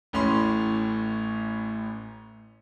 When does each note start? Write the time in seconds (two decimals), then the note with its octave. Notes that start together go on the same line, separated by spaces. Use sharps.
0.13 A1 A2 C#4 B5 C6